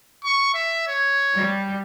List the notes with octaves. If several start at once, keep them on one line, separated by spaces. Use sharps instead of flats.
C#6
E5
C#5
G3